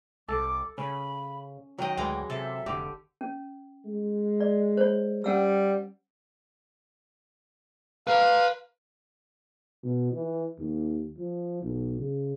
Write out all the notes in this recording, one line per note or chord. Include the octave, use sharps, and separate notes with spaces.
C2 A4 D6
C#3 C#4 B5
D#3 F#3 D#5 G5
D2 E3 G#3
C3 A4 E5
F1 D3 G4
C#4
G#3
D5
C5 C#5
G3 C#4 F#5 E6
B4 F5 A#5
B2
E3
D#2
F3
B1
C#3